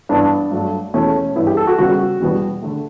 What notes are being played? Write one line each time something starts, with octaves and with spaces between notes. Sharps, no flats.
G2 E3 B3 D4
G2 F#3 A3
E2 B2 A3 C#4
G2 E3 B3 E4
G4
A4
F#4
C#3 G3 B3 F#4
E2 B2 G3 B3
D3 A3